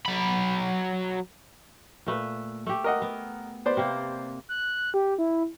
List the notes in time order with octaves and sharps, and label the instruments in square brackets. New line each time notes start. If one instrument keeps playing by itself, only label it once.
[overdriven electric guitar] F#3 B5
[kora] A#2 A3 B4
A3 G4
[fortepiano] A#4 D#5 F#5
[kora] B3
[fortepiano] B3 C5 D5
[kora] C3 A#3
[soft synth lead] F#6
G4
E4